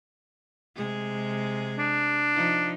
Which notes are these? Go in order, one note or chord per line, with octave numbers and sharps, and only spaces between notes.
C3 G#3 G#4
D4
F3 D#4